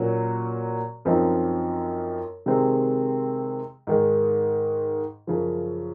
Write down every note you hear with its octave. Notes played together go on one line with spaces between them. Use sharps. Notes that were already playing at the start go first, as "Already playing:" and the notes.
Already playing: A#2 F#3 A#3 C#4 F#4
F#2 F3 C4 D#4
C3 D#3 G#3 C4
G#2 D#3 G#3
F#2 C#3 F3